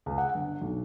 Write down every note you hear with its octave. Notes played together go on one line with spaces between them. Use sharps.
C#2
F#5
G1
B1